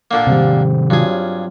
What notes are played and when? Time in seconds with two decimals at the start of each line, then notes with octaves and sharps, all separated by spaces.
0.11 A#2 D3 A#3
0.27 C3 D#3 G3 C4
0.90 G2 F#3 F4 G#4